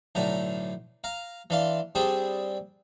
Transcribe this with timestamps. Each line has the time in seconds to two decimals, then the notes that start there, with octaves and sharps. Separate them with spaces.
0.15 B1 A2 D3 A#5
1.04 F5 A#5
1.50 E3 D4 F5 C6
1.95 G3 C4 D4 G#4